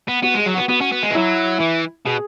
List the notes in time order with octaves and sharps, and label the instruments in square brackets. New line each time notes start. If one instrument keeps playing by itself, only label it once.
[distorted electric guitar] B3
[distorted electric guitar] B3 [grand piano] F#4
[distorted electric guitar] G#3 [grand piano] G#4
[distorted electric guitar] F#3
[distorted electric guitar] B3 [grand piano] F#4
[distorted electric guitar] B3 [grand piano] F#4
[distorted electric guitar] C#4
B3
G#3
E3
[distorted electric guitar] F#3 [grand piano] E4
[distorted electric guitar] E3
[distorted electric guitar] B2 [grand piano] G#4